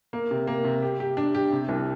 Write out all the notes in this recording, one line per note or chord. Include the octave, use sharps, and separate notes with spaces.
A#3
C3
A#3
C3
G4
G4
D4
G4
C3
C2